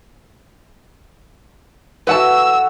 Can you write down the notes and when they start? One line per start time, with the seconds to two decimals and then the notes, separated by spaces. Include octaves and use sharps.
2.07 E4 F#4 A4 B4 F#5 A5 E6